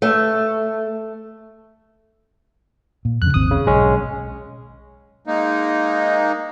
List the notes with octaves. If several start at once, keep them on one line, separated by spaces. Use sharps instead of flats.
A3
A#2
F2 C#3 F#6
D#1 G#1 C4 D#6
C#3
B1 G#3 C#4
G#3 A#3 D#4